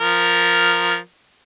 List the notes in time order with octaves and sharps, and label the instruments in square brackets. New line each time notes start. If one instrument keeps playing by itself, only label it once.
[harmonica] F3 A#4